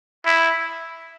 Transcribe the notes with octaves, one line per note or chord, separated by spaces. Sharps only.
E4